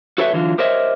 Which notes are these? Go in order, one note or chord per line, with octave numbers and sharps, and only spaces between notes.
F#4 A4 B4 C#5 D#5 E5
D3 E3 F#3 F4
G4 A#4 C5 C#5 D#5 E5